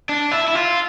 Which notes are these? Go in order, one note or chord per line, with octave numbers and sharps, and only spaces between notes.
D4
E4
E4
F4